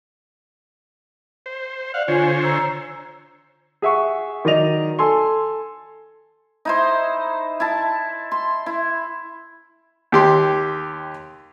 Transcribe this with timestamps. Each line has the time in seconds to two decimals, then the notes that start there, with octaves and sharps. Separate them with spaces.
1.46 C5
1.94 D5 F5 F#5
2.08 D3 F4 C5 C#5 G#5
2.43 A#5 E6
3.82 G#4 E5 F#5 C#6
4.45 D#3 F#3 D5 D#5 F7
4.99 A4 G#5 C6
6.65 D#4 E4 C5
7.60 E4 A5
8.31 C6
8.66 E4
10.12 D#2 G4 C6